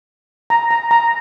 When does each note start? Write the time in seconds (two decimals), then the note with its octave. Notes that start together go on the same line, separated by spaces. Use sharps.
0.50 A#5
0.71 A#5
0.91 A#5